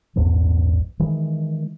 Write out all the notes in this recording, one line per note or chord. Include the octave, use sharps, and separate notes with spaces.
A#1 E2 G#2 F3
D#3 E3 G#3